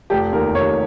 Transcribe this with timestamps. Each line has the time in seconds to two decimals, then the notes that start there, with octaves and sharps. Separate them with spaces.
0.10 F1 G4
0.32 D#2 A#4
0.55 D#2 C#5